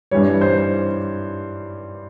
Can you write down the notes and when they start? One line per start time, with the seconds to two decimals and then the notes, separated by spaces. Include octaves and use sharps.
0.11 G2 E3 G3 C#5
0.41 C5